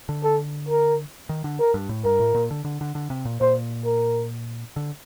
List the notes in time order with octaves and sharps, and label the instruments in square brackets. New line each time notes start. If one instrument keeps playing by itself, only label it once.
[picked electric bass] D3
[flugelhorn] A4
A#4
[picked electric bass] D#3
D3
[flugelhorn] A#4
[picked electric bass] G2
A2
[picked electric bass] G2 [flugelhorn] A#4
[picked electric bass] A2
A#2
D3
D3
D3
D3
C3
A#2
[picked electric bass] A#2 [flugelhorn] C5
[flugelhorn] A#4
[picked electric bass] D3